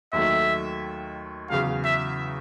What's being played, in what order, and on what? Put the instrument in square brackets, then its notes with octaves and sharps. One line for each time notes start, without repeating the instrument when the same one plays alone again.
[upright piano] D#2 D#3 F#3 A3 [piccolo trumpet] E5
[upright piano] E2 C#3 F#3 [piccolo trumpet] F5
[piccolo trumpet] E5